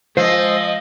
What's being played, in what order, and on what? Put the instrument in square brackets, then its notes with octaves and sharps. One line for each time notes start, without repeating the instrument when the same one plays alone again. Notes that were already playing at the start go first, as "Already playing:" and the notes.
[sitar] F3 [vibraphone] G#3 E6 [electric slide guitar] C5 [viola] D#5